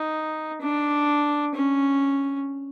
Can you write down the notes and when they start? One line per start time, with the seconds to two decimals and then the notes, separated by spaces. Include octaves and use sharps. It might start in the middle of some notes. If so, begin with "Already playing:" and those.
Already playing: D#4
0.61 D4
1.55 C#4